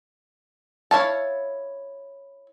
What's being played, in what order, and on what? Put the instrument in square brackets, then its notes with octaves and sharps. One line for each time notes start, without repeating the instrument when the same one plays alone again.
[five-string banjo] E4 C#5 F5 A5